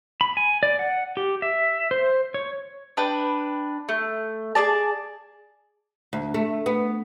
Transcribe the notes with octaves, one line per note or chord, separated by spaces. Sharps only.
B5
G#5
D5
F#5
G4
E5
C5
C#5
D4 B4 G5
A3
G#4 A#4 D5 A5
D2
A3
B3